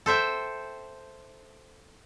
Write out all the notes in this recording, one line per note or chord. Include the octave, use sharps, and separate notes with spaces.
A4 C5 E5 G5